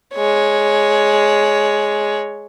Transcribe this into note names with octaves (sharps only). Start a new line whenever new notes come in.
G#3 C#5